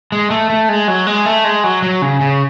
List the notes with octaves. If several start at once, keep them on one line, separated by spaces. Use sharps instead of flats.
G#3
A3
A3
G#3
F#3
G#3
A3
G#3
F#3
F#3
C#3
C#3